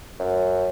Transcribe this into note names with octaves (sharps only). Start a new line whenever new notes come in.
F#2